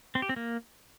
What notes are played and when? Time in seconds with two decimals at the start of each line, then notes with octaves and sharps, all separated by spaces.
0.15 C4
0.22 G4
0.29 C4
0.36 A#3